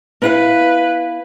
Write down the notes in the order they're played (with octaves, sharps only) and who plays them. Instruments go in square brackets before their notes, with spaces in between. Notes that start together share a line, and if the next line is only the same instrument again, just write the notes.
[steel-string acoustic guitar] B3 E4 F5 [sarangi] B4